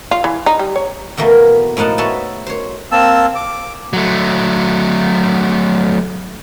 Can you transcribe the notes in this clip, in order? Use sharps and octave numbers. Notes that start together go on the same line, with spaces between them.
F4
E3
D#4
G3
C#5
E2 B2 A3 A#3
A2 F3 D#4 F#5 A5
A3 B3 F#4 A4 C#5 A5
C5 C#5
A#3 C4 A5 E6
D6
F#3 A3